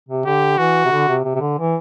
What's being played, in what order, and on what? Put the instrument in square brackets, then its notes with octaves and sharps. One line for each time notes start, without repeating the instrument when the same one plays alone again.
[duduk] C3
[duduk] D3 [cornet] G4
[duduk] E3 [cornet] F#4
[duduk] C3
D3
C3
C3
C3
D3
E3